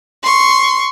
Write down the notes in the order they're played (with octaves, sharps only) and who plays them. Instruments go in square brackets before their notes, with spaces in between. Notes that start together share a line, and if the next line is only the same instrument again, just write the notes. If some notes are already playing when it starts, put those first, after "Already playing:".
[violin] C6 C#6